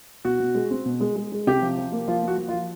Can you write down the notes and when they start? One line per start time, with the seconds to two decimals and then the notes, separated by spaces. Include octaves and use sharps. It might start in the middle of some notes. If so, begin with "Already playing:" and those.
0.25 B2 F#4
0.40 B2
0.55 G#3
0.71 C4
0.86 B2
1.00 G#3
1.16 G#3
1.32 G#3
1.47 C3 G4
1.62 F3
1.78 F3
1.92 A#3
2.08 F3 F4
2.22 A#3
2.28 F#4
2.38 F3
2.48 F4
2.53 F3